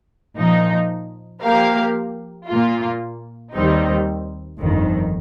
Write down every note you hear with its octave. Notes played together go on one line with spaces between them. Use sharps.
A#2 F3 D#4
F3 A#3 G4 A#4 F5
A#2 A#3 F4
D#2 D#3 G3 C4 D#4
G1 F2 D#3